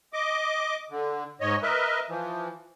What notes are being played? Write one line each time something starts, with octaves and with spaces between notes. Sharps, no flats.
D#5 D6
D3
G#2 C#5 D#5
A#4 B4 D#5 E5
E3 F3